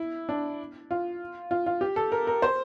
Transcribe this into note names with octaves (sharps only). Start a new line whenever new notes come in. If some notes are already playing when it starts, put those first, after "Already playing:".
Already playing: E4
D4
F4
F4
F4
G4
A4
A#4
A#4
C5